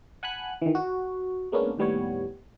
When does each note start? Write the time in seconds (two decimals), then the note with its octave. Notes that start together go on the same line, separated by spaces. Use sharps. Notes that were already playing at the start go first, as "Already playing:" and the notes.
0.23 F#5 G#5 A5 B5 F#6
0.62 D#3 E3
0.75 F#4
1.52 G#3 A#3 B3 C#4 D4
1.77 D#2 A2 G3 B3 C#5